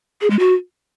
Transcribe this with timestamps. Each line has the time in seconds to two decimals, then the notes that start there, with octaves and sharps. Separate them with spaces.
0.21 G#4
0.30 G#3
0.39 F#4